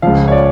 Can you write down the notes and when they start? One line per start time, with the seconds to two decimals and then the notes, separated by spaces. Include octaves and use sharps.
0.02 C#2 C#3 F3 F5
0.28 C#5
0.32 D5